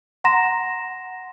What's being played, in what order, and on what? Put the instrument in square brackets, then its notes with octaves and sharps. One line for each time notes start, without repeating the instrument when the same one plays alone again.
[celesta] F#5 A#5 C6 A#6 E7